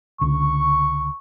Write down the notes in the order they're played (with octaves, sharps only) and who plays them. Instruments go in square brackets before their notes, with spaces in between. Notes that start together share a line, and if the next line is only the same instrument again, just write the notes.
[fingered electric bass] C#2 D3 [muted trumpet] C#6